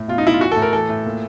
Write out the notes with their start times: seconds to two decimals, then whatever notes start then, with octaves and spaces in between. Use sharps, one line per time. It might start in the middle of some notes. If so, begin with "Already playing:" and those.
Already playing: A2
0.08 B2 F4
0.18 D#4
0.25 B2 E4
0.34 F4
0.41 E3 F#4
0.51 A4
0.56 A2
0.62 A#4
0.73 E3 A4
0.89 A2
1.05 A#2